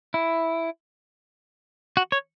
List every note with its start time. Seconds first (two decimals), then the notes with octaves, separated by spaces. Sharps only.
0.14 E4
1.97 F#4
2.12 C#5